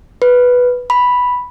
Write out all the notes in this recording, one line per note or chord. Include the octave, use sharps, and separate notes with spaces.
B4
B5